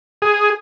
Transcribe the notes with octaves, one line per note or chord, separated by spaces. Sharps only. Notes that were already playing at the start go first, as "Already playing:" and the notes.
G#4